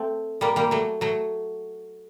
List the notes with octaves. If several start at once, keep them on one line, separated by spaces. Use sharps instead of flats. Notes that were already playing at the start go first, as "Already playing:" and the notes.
Already playing: A3 C4
G3 A#3
G3 A#3
F#3 A3
F#3 A3